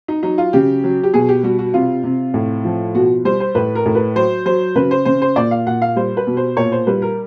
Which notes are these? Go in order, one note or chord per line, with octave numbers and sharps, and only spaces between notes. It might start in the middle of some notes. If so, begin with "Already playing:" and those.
D#4
F#3 D#4
F4
C#3 G4
F#3
G4
B2 G#4
G4
G3 F#4
F#4
C3 F4
C3
A2
F3
B2 F#4
G3 C5
C5
A2 B4
A#4
A2
B4
F#3 C5
F#3 C5
C#3 B4
C5
C#3 C5
C5
A#2 D5
F5
A#2 F#5
F5
G3 C5
B4
B2
C5
A#2 C#5
C5
G3 B4
A#4